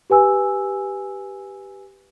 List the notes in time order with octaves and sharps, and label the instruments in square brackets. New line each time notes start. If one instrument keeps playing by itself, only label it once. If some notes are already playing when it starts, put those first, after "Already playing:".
[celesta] G4 B4 G#5 E6